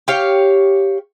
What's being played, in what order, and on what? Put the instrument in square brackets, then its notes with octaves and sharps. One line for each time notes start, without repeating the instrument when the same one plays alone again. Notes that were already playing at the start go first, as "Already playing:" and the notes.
[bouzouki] G4 C#5 F5